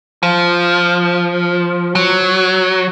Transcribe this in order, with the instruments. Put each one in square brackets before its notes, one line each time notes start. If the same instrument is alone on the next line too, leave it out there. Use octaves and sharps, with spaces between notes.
[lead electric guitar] F3
F#3